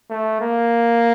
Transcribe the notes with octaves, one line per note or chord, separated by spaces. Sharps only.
A3
A#3